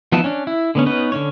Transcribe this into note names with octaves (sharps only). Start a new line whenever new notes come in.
F3 B3 D#4 E4 A5
C#4 D4
E4
D3 B3 C#4
B3 C#4 D#4 B4
D3 C#4 C#5